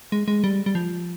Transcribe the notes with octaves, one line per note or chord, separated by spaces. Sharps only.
G#3
G#3
G3
G3
F3